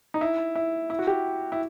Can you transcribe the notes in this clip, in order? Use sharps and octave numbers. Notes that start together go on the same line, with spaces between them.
D#4
E4
E4
E4
F#4
G4
E4